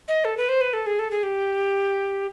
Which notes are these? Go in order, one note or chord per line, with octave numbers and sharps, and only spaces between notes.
D#5
A4
B4
C5
B4
A4
G#4
A4
G#4
G4